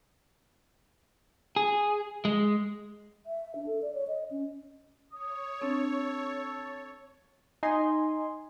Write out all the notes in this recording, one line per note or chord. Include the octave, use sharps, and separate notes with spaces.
G#4
G#3
E5
D4
A4
D5
C#5
D#5
C#4
C#5 D#6
C4 D4 A4
D#4 D#5 G#5 C6